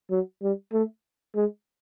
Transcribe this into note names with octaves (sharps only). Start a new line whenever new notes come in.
F#3
G3
A3
G#3